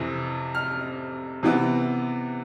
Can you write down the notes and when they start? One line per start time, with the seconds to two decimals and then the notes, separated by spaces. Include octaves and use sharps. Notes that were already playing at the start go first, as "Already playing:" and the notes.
Already playing: F2 C3 E3
0.55 F6
1.43 C3 E3 B3